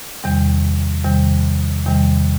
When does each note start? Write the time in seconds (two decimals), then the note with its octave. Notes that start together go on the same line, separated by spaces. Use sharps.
0.24 E2 C3 D#3 G3
1.05 E2 C3 D#3 G3
1.86 E2 C3 D#3 G3